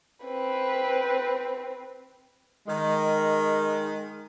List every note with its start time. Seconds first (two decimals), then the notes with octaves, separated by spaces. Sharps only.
0.25 C4 B4
2.67 D#3 G#3